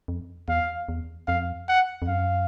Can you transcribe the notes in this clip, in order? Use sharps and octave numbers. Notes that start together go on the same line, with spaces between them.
F2
E2 F5
E2
F2 F5
F#5
F2
F#2 F5